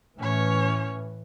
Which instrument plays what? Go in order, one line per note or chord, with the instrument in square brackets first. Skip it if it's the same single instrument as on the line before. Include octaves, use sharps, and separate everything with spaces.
[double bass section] A2 E3 [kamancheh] C#4 C#5